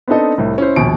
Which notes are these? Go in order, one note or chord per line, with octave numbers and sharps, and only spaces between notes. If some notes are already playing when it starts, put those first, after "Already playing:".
B3 C4 D4 D#4 A4 D#5
C2 A2
C#4 E4 C5
A#1 D#2 B2 G#5 D7